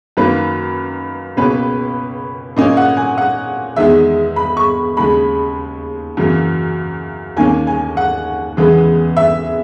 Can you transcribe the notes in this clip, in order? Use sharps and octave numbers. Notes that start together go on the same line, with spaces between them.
F#2 D#3 A#3 B4
C#2 B2 A#3 C#4 B4
A#2 A#3 C#4 D#5
F#5
G#5
F#5
E2 D#3 G#3 E5
B5
C#6
D#2 C#3 G#3 B5
F#2 C#3 E3 A#3
D#2 D#3 A#3 C#4 G#5
G#5
F#5
E2 C#3 E3 G#3 B3
E5